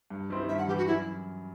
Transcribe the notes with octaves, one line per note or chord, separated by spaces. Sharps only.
G2
D#3 G3 C4 E4
G2 E5
F#5
E3 G3 G4
F#4
F#2 E4